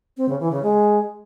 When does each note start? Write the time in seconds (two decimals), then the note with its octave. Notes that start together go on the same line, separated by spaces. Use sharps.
0.17 C4
0.29 C#3
0.40 E3
0.51 C#3
0.63 G#3